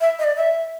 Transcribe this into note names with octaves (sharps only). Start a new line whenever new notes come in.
E5
D#5
D5
E5